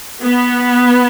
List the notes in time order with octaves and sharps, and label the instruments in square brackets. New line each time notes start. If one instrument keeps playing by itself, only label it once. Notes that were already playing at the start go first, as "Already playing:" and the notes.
[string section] B3